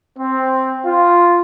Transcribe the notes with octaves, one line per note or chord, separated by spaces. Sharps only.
C4
F4